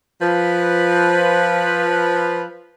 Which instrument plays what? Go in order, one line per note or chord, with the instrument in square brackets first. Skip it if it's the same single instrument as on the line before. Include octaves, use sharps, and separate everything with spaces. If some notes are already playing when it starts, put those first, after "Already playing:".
[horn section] F3 B4